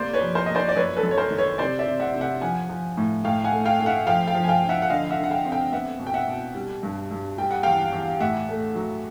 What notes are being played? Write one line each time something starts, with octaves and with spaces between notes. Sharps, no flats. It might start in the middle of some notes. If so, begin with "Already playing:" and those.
Already playing: C3 A#3 C5 D5
B4 C#5
F3
A#4 C5
A#3 D#5
C5 D5
D5
F#2 B4 C#5
A4 B4
F#2
C#5
A#4 C5
D#3
B4 C#5
C3 C5 D5
D5 E5
C3
E5 F#5
C3
E5 F#5
F3 F#5 G#5
F3
A2
A2 F5 G5
F#5 G#5
A3
F5 G5
A3
E5 F#5
F3 F5 G5
F5 G5
F3
G#5
F5 G5
F3
E5 F#5
F#5
D3 D#5 F5
E5 F#5
D3
F#5
F5 G5
C4
F5 G5
B3 E5 F#5
B2
G5
E5 F#5
B2
G3
G2
G2
G3 G5
F#5
E2 F5 G5
E2
A2 E5 F#5
A3
F#3